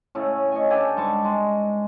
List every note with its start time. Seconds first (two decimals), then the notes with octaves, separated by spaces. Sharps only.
0.15 A2 C#3 A3
0.52 C#5 D#5 G#5
0.70 D3 G4 A4 G#5
0.97 G#2 G3 A5 C#6
1.25 G#3